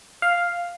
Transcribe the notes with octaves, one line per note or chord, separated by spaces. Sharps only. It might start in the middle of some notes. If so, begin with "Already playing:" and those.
F5